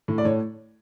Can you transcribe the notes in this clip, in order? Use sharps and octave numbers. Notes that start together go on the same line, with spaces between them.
A2
D5
A2 C#5